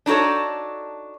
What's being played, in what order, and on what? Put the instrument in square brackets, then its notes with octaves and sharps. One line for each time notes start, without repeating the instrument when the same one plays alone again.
[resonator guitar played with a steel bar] D4 D#4 F#4 A4 C#5